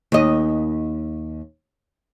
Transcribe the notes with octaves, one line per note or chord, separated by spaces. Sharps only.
D#2 D#5